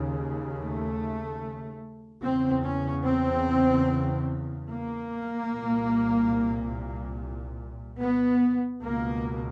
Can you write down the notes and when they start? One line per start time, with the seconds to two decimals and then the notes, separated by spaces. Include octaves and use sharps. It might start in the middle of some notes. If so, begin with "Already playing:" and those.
Already playing: D#2 C#3
0.58 A3
2.22 E2 C#3 C4
2.63 C#4
3.05 C4
4.69 A#3
5.52 C2 A#2
7.99 B3
8.82 C#2 B2 A#3